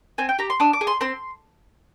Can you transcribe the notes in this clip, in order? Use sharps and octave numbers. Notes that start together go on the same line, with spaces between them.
C4 G#5
G5
G4 A#5
C6
D4 D#6
D6
G#4
C6
C4 C6